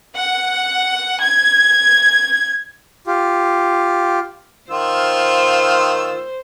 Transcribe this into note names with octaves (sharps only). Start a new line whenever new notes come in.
F#5
G#6
F4 G4
D#3 F4 C5 E6